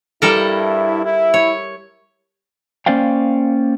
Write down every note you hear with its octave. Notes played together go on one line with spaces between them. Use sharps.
G2 G3 E4 A4 A#4
E4
C#5
A#3 C#4 C5 D5 F5 G5